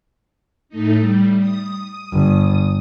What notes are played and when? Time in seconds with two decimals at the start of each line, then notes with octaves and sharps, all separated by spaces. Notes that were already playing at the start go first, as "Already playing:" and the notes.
0.69 A2 A3 D#4
0.99 G3
1.39 D#6
2.13 G1